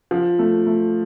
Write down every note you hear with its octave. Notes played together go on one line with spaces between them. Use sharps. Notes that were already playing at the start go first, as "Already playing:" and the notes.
F3
A3
A3